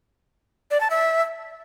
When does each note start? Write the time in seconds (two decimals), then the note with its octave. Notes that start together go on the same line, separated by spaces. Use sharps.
0.71 D5
0.81 A5
0.90 E5